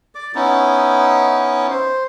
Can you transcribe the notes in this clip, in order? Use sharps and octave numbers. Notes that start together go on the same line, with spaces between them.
D5 D6
B3 C#4 D#4 E4
C5